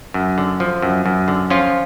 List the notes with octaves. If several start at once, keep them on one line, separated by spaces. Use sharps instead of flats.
F#2
D3
F3
F#2
F#2
D3
F3 C#4 F4